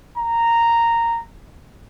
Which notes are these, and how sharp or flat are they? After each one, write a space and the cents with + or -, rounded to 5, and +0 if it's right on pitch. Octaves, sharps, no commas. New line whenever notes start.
A#5 -10